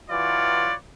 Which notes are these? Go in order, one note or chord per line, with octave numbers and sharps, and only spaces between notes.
E3 F#3 F4 B4 C#5 D5